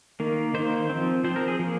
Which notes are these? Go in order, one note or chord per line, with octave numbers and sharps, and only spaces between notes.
D#3 A#3
D#3 A#3 C5
F3 C4
F3 C4 C5
A#4
G#4
F3 A#3